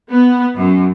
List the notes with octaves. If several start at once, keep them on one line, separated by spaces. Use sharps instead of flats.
B3
F#2